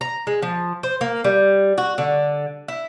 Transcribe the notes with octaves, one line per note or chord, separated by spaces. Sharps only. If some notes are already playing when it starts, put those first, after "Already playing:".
A#5
G#3
F3
C5
A#3
G3
F#4
D3
E4